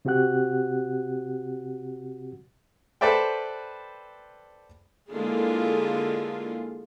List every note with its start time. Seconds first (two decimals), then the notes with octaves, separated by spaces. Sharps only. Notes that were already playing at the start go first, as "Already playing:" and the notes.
0.05 C3 C4 F#4 G4 F#5 F#6
3.01 A4 B4 C5 D5 E5 G5
5.11 D3 G#3 A#3 E4 F4 G#4